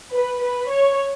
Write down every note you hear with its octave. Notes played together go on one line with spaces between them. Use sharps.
B4
B4
C#5